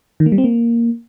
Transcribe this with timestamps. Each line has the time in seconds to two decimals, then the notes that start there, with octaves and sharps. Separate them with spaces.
0.20 D#3
0.26 A#3
0.32 G3
0.38 C4
0.44 A#3